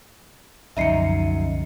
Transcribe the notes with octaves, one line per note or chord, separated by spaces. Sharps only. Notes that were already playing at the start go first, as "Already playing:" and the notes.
C2 F#2 D3 F3 D#4 E5 C7 C#7